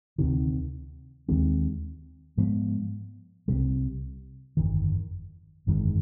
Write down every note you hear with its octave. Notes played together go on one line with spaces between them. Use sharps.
D2 C3 D#3
D#2 D#3 G#3 C4
G#2 F3 G#3 B3
C2 C3 G3
G1 F2 D#3
G1 F2 D#3 G#3